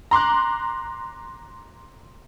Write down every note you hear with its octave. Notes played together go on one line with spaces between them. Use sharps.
A#5 C6 D6 F#6